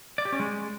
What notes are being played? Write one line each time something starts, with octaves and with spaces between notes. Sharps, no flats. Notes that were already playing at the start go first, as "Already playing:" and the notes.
D5
G4
C#4
G#3